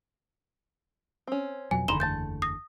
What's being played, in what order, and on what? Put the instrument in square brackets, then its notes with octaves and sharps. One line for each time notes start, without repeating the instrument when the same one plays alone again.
[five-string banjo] C4 C#4
[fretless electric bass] F2 B2 F#3 [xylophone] G#5
[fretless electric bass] F#1 E2 D3 [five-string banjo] D#4 B5 [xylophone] C6 E7 G7
[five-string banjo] A3 A5 [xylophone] G6 A6
[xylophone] D#6 A#6